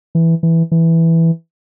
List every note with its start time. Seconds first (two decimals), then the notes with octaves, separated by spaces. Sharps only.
0.15 E3
0.43 E3
0.72 E3